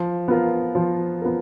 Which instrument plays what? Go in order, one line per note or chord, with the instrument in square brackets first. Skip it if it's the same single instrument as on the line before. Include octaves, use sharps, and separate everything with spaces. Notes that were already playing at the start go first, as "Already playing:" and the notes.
Already playing: [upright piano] F3
B3 F4 A#4
F3
B3 F4 A#4